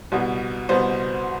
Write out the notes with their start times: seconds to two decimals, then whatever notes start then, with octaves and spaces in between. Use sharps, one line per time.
0.12 C2 B2 B3
0.69 C2 B2 B3 C5